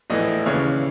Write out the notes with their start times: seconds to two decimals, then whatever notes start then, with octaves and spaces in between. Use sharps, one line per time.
0.10 A#1 A2 E3 D#5
0.46 D#2 C#3 E3 C#5